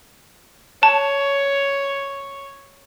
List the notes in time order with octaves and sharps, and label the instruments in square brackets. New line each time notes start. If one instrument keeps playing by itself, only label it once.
[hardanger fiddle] C#5 [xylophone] A5